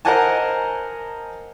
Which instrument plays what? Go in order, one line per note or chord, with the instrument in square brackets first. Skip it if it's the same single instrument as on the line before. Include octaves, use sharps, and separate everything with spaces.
[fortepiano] A#4 C5 D#5 F#5 G#5 A5